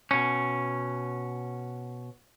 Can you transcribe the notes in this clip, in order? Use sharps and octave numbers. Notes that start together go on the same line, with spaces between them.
B2 C#4